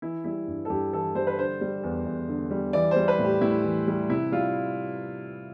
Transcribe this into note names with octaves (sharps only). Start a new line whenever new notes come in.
E3 E4
G3 E4
G2
A4
G2 G4
E3 A4
G3 C5
B4
D3 C5
G3
E2
E2
D3
G3
E3 D5
G3 C5
B4
A2
G4
A2 E4
E3
G3
C3 E4
G3 F4